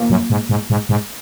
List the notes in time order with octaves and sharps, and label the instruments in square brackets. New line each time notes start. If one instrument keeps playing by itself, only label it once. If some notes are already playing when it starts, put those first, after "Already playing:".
Already playing: [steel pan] A#3
[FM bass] F#2
G#2
G#2
G#2
G#2